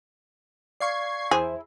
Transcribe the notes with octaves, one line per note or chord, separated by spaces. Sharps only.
D5 F5 C#6 G#6 C7
E2 E4 G#4 C5